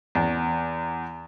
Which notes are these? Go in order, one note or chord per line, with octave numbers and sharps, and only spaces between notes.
E2